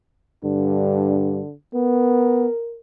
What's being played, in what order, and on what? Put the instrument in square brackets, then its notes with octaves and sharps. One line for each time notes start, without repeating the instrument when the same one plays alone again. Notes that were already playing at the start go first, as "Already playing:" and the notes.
[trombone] G2 [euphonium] D3
[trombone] B3 [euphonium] A#4